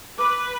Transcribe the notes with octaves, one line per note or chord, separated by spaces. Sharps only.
B4 D6